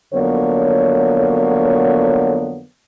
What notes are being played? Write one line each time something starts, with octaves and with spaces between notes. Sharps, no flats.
F2 D3 F#3 A#3 B3 C#5